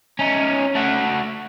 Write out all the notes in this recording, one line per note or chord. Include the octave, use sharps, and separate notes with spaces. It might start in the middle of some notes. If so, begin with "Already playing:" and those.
C#4 D#4
A3 F#4